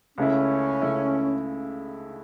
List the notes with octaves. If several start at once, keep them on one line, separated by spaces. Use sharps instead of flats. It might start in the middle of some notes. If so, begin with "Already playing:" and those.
C#2 C#3 A3 C#4 E4
C#2 C#3 A3 E4